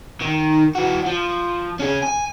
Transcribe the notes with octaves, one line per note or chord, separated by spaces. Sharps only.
D#3
E3 F#4
F3
C#4 G#4
G#5